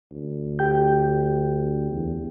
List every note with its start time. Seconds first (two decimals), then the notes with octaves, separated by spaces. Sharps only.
0.11 D2
0.59 G4 G5 G6
1.92 E2